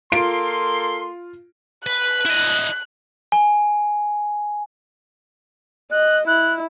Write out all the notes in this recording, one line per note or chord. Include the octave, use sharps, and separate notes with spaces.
A#3 F4 A4 C6 D7
B4 F#6
E4 D#5
G#5
D#5 F#6
E4 F#6